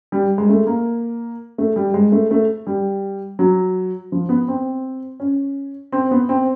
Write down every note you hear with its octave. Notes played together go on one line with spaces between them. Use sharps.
G3
G#3
A3
A#3
A3
G3
G#3
A3
A3
G3
F#3
F3
B3
C4
C#4
C4
B3
C4